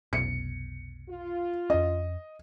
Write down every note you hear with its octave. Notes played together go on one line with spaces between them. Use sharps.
F1 B1 B2 C#7
F4
F2 C#4 D#5